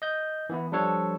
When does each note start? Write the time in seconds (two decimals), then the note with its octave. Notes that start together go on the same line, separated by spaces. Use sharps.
0.02 D#5 G6
0.49 E3 B3 E4
0.72 F3 G3 D4 A4 C#5